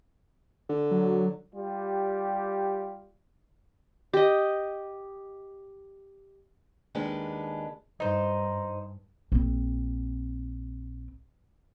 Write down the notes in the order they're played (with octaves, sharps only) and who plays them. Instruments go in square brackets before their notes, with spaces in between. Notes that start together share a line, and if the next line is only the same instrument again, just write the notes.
[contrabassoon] D3
[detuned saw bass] F#3
[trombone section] G3 F4 G4
[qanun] G4 D#5
[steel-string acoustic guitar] D#2 G#3 C#4 D4 B4
[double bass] G2 [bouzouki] D#4 C5
[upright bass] A#1 C4